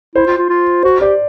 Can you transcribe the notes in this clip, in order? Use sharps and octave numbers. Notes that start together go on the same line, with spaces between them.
E4 C5
F4
F4
F4
F#4 C5
G4 D5